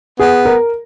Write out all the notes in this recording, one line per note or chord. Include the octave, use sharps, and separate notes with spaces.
B3 G#4
A#4